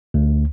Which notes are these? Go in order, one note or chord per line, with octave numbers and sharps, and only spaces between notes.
D2